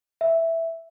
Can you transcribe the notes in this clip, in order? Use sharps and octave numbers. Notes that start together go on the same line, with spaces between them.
E5